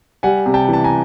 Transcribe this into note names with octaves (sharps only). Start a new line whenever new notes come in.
G3 F#5 G#5
C3
G5 A5
E3 A5
G#5 A#5